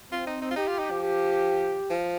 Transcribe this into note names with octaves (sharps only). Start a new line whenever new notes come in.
C4 F4
D#4
D#4
F4
D#4 G4
F4
D#4
F3
G4
F3